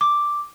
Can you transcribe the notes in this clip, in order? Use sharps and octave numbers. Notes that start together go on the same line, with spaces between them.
D6